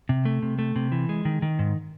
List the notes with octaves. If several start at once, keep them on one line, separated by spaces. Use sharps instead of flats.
C3
A3
C3
A3
C3
E3
G#3
D#3
D#3
G#2